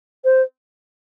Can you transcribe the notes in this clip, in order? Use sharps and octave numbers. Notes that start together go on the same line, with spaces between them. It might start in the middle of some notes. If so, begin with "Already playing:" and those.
C5